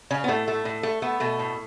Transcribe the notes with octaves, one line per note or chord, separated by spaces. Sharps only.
C#3 C#4
B3
A2 A3
A3
A2
A3
A3 B3
B2 A3
A2